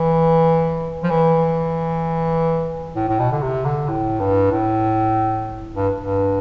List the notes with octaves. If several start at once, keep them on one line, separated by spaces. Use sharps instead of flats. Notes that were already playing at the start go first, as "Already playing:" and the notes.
Already playing: E3
F3
E3
A2
A2
B2
D3
C3
D3
A2
G2
A2
G2
G2